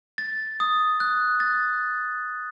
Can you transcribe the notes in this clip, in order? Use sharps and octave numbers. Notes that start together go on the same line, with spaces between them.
A6
D#6
F#6
A6